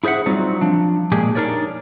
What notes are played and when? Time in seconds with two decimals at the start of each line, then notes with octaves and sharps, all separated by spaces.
0.04 E4 G#4 C5 E5 F#5
0.26 F#3 G3 C4 D#4 F4
0.61 F3 D4
1.12 A#2 G#3 G4 G#4
1.35 D4 D#4 A#4 C#5 D5